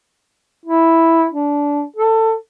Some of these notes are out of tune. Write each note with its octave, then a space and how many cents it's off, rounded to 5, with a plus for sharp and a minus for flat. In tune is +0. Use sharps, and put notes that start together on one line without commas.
E4 -5
D4 -20
A4 +20